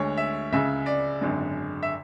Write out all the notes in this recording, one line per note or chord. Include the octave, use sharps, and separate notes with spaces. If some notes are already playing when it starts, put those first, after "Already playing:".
Already playing: D2 D3 G#3 C#5
E5
C#2 C#3 G#3 E5
D5
G#1 F#2 D3 G#3
E5